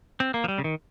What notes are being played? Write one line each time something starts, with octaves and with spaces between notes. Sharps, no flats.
C4
A#3
F3
G3
C#3
D#3